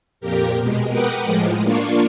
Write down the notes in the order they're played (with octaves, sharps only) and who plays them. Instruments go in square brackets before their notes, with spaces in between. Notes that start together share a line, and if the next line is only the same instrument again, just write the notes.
[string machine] F2 A#2 G4 A#4
B2 G#3
A#4 B4 F#5 G5 D6 D#6
A2 F3 G#3
A#3 D4 F4 C#6